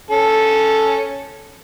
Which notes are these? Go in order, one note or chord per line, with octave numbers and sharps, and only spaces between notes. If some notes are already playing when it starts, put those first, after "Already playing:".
C#4 A4